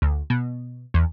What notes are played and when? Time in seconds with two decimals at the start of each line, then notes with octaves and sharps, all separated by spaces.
0.02 D2
0.30 B2
0.94 E2